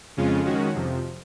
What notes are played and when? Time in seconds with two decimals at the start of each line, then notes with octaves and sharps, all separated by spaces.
0.17 F2 C#3 G#3 C#4 F4
0.45 D#3 G#3 C#4 F#4
0.75 F2 C3 F3